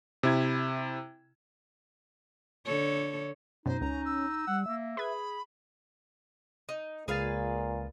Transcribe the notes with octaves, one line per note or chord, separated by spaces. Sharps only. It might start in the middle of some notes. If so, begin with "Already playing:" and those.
C3 E4 G#6
D3 A4 C#5
F#2 B2 D#4 C5
C#2 C#4 A#5
E6
G3 F#5
A#3 E5
G#4 B4 B5 G#6
D#4
C#2 A#2 G#4 B4 F5 A6